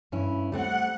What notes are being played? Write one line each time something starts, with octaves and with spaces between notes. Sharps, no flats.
G2 C#4 E4
G3 A3 C4 F#5